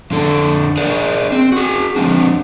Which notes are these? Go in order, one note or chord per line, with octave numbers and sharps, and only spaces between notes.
F2 D3 A4
G#4 A#4 D5
C4
F#4 G#4
F3 C4 D4